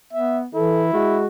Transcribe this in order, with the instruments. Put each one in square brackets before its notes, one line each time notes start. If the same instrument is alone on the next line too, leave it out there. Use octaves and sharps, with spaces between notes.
[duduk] B3 [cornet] E5
[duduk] E3 [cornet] E4 [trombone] A4
[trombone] G#3 [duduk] F#4